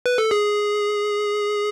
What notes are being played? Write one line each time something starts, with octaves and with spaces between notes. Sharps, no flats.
B4
A4
G#4